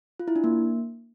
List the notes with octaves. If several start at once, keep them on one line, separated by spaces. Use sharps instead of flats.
F4
E4
D4
A#3